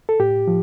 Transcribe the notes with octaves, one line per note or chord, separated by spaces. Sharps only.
A4
A2 G4
F3